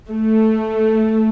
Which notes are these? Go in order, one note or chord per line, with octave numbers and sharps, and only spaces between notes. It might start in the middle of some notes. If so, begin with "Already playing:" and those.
A3